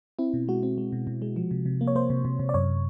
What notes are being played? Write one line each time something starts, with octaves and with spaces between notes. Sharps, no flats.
C4 E4
B2
G#3 F#4
C4
G#3
B2
B2
G#3
F3
C3
C3
A#3
C#5
A#3 C5
C3
C3
C3
D5
F#2 C#5